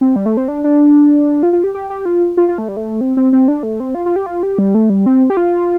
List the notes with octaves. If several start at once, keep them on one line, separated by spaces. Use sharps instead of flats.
C4
G3
A3
C4
D4
D4
F4
F4
G4
G4
G4
F4
F4
F4
A3
G3
A3
C4
C4
C4
D4
A3
C4
F4
F4
G4
F4
G4
G3
A3
G3
C4
G4
F4